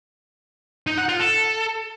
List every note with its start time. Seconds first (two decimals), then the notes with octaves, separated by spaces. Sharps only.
0.87 D#4
0.98 F#5
1.09 F4
1.19 A4